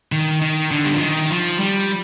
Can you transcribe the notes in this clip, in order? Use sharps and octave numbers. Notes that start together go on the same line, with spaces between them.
D#3
D#3
D3
G3
F3
D#3
F3
G3